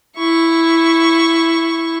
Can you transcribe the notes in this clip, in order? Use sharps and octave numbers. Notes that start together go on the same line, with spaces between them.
E4 C#6